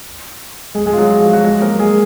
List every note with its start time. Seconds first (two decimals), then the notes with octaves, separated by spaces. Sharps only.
0.75 G#3 G#4
0.86 G#3 G#4
0.93 F4
0.98 F#3 F#4
1.21 F3 F4
1.33 F#3 F#4
1.44 G#3 G#4
1.62 A#3 A#4
1.79 G#3 G#4